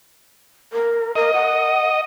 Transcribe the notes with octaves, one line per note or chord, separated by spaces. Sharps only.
A#4
A#4 D#5
F#5